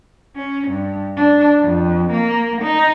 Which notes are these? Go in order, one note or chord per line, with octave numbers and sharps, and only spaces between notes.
C#4
G2
D4
F2
A#3
D#4